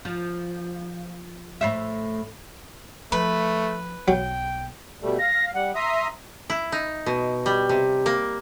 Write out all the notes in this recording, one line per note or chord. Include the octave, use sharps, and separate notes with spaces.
F3
A2 C5 E5
F3 A3 B4
B1 F#3 G5
B2 G3 A3
F5 A#6
G3 F#5
E5 A#5 C6 D#6
E4
D#4
B2
G3
C3
A#3